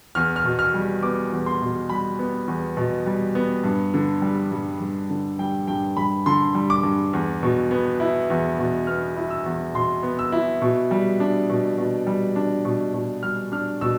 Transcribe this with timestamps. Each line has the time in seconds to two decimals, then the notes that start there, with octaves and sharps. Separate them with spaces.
0.15 E2 F6
0.36 F6
0.44 B2
0.59 F6
0.74 G3
1.03 B3 D6
1.32 E2
1.46 C6
1.61 B2
1.89 G3 B5
2.19 B3
2.48 E2
2.77 B2
3.06 G3
3.35 B3
3.64 G2
3.94 D3
4.22 G3
4.52 G2
4.80 G2
5.10 D3
5.39 G3 G5
5.68 G2 G5
5.97 G2 B5
6.26 D3 C6
6.55 G3
6.70 D6
6.83 G2
7.13 E2
7.43 B2
7.71 B3
8.00 E4
8.30 E2
8.59 B2
8.87 B3 F6
9.17 E4
9.30 E6
9.46 E2
9.74 B2 C6
10.03 B3
10.19 E6
10.32 E4
10.62 B2
10.91 G3
11.20 D4
11.50 B2
11.78 B2
12.07 G3
12.36 D4
12.65 B2
12.94 B2
13.23 G3 F6
13.52 D4 F6
13.81 B2 E6